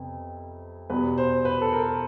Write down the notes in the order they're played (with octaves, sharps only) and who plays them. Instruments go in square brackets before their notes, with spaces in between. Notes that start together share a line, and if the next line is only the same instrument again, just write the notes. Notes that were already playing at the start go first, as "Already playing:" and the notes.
Already playing: [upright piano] F2 C3 B3
E2 B2 G3 B4
C5
B4
A4
A#4